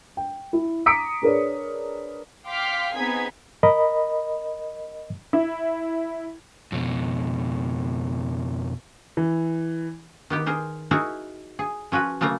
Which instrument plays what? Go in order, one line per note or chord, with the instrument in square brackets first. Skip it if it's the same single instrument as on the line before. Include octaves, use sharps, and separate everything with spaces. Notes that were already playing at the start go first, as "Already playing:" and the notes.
[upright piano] G5
E4
A#5 D6 D#6 B6 C#7 D7
D4 G#4 A#4 B4 C#5 D5
[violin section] F5 G5 C6 D6 F6 B6
B3 C4 D#4 G#4 G#6 B6
[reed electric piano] A#4 D#5 B5
[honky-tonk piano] E4
[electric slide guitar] F2 B2
[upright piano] E3
[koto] D#3 B3 G4
G#4 A#4 C5
D#4 E4 F#4 G#4 A#4
G#4
F3 C#4 F#4 B4
C#3 F#3 A3 A#3 A#5